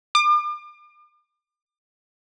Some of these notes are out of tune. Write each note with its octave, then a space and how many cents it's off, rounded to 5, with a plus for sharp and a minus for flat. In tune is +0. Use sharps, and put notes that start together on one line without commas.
D6 +40